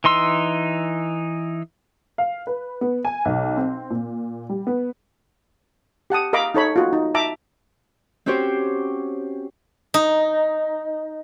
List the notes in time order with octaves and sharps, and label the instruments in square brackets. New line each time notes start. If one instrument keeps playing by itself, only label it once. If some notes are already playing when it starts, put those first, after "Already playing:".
[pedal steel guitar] E3 D#4 C6 E6
[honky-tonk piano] F5
B4
B3
G#5
B1
C4
A#2
G3
B3
[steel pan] G4 F#5 A5 D#6
A#4 D#5 F5 A#5 B5 D6
D#4 A4 C#5 B5
F4 F#4
D#4
E5 A5 A#5 D6
[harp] C4 C#4 F#4 G4 C5 C#5
[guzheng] D#4